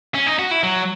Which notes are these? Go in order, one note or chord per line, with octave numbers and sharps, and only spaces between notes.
C#4
D#4
F#4
E4
F#3